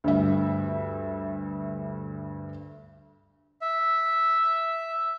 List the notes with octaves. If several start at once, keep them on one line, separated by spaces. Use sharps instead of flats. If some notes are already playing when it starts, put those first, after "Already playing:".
D2 G2 E5
E5